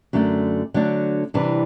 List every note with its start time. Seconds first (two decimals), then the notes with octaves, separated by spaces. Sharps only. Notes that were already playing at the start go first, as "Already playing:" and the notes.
0.13 F#2 D3 A3
0.74 D3 F#3 A3 D4
1.34 C3 E3 G3 D4